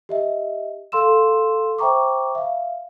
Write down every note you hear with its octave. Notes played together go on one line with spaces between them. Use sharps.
G4 D#5 E5
A4 F5 C6 E6 E7
C5 E5 G5 A#5 C#6 D6
E5 F5